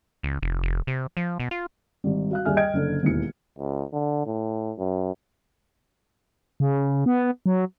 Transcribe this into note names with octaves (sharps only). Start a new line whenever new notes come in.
C#2
F1
F1
C3
F3
B2
F4
G#1 G3
F#4 F5 F#6
D#2 G3 G#4 E5 G#5 F6
D#5 G5 G#6 D7
F#1 D3 A4
E1 D#2 E3 C#7
C#2
D3
A2
F#2
C#3
B3
F#3